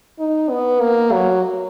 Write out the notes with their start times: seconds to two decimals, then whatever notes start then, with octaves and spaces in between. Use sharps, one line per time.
0.19 D#4
0.50 B3
0.81 A#3
1.13 F#3